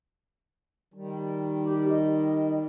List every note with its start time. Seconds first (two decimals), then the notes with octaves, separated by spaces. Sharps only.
0.94 D#3 G3
1.64 G4
1.89 D#5